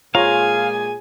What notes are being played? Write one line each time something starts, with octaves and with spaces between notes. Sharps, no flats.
A#2 G#3 F4 G#4 C#5 F5 G#5 A#5